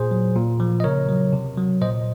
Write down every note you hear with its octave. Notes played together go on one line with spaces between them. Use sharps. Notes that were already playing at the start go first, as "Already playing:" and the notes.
Already playing: A#2 G#4 C5
F#3
A#2
F3
D#5
C#3 A#4 C#5
F#3
C3
F#3
A#2 C5 D#5